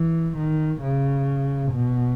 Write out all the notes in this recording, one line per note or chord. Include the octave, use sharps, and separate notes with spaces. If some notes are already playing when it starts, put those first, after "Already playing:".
Already playing: E3
D#3
C#3
B2